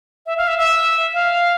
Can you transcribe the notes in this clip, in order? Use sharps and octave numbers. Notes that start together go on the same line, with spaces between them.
E5
F5
E5
E5
F5